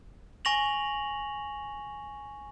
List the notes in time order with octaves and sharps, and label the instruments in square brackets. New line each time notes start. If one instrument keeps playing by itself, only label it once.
[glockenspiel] G#5 C#6 A#6 F7 F#7